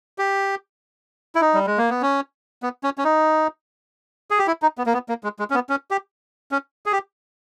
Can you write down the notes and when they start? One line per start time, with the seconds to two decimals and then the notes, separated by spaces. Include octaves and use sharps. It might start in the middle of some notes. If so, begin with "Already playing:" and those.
0.18 G4
1.35 E4
1.41 D#4
1.54 G3
1.67 G#3
1.78 A#3
1.90 B3
2.02 C#4
2.63 B3
2.84 C#4
2.98 C#4
3.05 D#4
4.31 G#4
4.39 G4
4.47 E4
4.62 D#4
4.78 B3
4.86 A#3
4.94 B3
5.09 A#3
5.24 G#3
5.39 G#3
5.50 C#4
5.55 B3
5.69 C#4
5.91 G4
6.51 C#4
6.86 G#4
6.92 G4